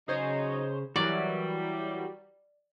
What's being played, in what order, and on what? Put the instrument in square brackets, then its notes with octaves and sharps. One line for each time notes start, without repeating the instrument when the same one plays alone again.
[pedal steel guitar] C#3 [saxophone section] F#3 C#4 D#4 [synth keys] G#4 C5 C#5
[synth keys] E3 F#3 A#4 [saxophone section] G3 [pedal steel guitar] F#4 G4 [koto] D5